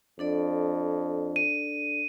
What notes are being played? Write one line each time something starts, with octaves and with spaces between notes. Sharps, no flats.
F2 D4 A4 D5
D#7